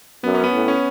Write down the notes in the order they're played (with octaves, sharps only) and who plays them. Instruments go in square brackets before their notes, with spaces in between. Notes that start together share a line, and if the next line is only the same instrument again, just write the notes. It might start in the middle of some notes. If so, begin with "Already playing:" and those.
[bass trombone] F#2 [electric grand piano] B3
[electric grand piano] C#4
B3
[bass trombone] A2
[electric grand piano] C#4